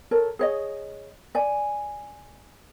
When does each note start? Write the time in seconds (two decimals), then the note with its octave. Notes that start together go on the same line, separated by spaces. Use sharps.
0.11 A4 A#4 C#5
0.39 G#4 C#5 D#5
1.35 D5 G#5